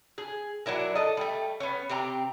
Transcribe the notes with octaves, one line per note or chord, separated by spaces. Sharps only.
G#4
F#3 D4 E4 A#4
A4 D#5
G3 A3
B3 C#4
C3 C4 G4 A#5